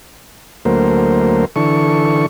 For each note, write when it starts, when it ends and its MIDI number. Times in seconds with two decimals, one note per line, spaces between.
0.65 1.45 38
0.65 1.45 54
0.65 1.45 57
0.65 1.45 58
0.65 1.45 70
0.65 1.45 72
1.56 2.26 50
1.56 2.26 52
1.56 2.26 69
1.56 2.26 85